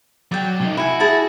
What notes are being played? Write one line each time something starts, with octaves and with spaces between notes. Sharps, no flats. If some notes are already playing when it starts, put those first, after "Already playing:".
F#3 D5 G5
C3 D#4
E4 F#4 G#5
E4 G#4 A5